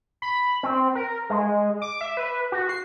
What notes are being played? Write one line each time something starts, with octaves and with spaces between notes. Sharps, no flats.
B5
C4
A#4
G#3
D6
E5
B4
F#4
C7